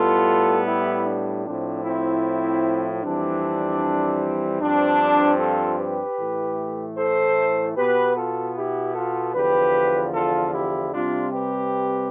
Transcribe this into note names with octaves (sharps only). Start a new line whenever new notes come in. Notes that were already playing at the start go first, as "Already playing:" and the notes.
Already playing: A2 G3 B3 F4 A4
E4 G4
D4
A2 F3 C4 D4
C4 E4
F2 E3 G3 C4 D4
G2 F3 C4 D4
F4 A4
G4 B4
A2 E3 A3
A4 C5
B2 B3 G4 B4
F4 A4
E4 G4
F4 A4
E2 D3 F3 G4 B4
F4 A4
E4 G4
C3 G3 C4 D4 F4
G4 B4